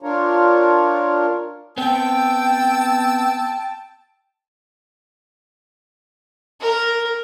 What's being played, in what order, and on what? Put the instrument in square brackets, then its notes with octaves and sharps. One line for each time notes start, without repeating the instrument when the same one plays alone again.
[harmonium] D4 F4 A#4 C#5
[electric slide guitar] B3 C4 [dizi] G5 [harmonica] A5 E6
[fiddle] A#4